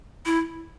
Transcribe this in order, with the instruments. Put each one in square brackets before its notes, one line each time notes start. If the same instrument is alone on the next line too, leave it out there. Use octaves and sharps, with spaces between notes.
[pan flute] E4